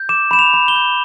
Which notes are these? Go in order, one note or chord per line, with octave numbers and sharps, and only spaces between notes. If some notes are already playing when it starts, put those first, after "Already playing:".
Already playing: G6
D6 E7
B5 E7
F7
B5
G7
G6